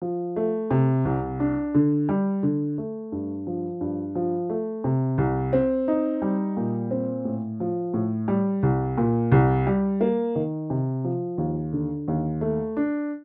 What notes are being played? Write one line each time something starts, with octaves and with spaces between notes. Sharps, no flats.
F3
A3
C3
C2
D4
D3
G3
D3
A3
G2
F3
G2
F3
A3
C3
C2
C4
D#4
G3
A#2
C4
A2
F3
A2
G3
C2
A#2
C2
G3
A#3
D#3
C3
F3
D#2
D3
D#2
A3
D4